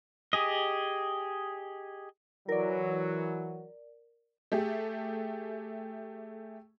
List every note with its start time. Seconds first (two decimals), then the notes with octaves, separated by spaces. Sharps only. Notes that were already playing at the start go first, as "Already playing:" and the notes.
0.33 G4 G#4 D#5
2.49 E3 F#3 A#4 D5
4.52 A3 G4 G#4